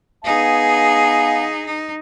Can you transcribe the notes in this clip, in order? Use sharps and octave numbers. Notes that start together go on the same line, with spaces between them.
B3 D#4 G#4 F5 G#5
D#4